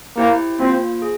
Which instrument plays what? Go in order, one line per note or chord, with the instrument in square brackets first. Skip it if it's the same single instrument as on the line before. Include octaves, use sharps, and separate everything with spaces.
[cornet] A#3 [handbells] E4 G4 C5 G5
[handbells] A#3 F4 C5 [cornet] C4
[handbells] G#4